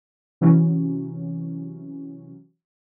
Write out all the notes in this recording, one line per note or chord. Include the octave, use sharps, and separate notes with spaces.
C3 E3 F#3 C#4